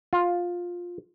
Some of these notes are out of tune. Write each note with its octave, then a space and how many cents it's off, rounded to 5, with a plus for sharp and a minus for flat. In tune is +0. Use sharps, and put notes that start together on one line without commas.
F4 +10